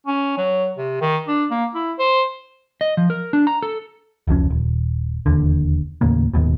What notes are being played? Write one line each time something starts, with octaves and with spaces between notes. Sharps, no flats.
C#4
F#3
C3
D#3
D4
A#3
E4
C5
D#5
F3
A#4
D4
A#5
A4
F1 C#2 F3 C#4
D#1
E1 A#1 D#2 D3
D#2 A2 C#3 A#3
D#1 D#2 G#2 B2